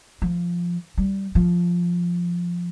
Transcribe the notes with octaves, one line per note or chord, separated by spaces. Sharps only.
F3
G3
F3